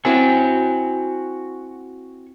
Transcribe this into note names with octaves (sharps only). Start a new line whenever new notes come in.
C4 E4 F#4 G5 G#5